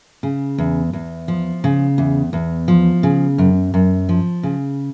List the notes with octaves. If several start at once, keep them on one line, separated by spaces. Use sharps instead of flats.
C#3
E2
E2
F3
C#3
E2
E2
F3
C#3
F#2
F#2
F3
C#3